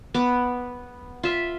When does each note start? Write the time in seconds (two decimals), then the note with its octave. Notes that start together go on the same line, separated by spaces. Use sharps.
0.14 B3 D6
1.23 F4 E5